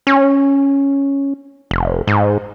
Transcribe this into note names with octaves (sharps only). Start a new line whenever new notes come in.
C#4
F1
G#2